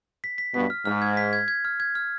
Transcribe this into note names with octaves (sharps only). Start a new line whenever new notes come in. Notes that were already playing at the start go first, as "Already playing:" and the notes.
B6
B6
G2 B2 B6
F6
G#2 F6
G#6
B6
G#6
G#6
F6
G#6
F6